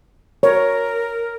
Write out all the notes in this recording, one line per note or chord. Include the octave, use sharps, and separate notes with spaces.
A#4 C#5